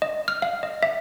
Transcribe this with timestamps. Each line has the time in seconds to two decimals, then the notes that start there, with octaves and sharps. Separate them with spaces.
0.02 D#5
0.28 F6
0.42 F5
0.63 D#5
0.83 E5